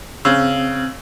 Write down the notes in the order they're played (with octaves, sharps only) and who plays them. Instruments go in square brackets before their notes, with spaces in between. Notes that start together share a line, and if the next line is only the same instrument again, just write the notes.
[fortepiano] C#3 [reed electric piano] C4 E6